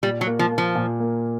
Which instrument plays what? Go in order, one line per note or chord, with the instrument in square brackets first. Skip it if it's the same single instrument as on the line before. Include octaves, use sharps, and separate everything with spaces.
[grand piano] A#2 [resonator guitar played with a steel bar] G3
[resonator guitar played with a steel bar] F#3
[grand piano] A#3
[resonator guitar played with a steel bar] F3
[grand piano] A#3
[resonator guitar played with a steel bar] F3
[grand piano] A#2
A#3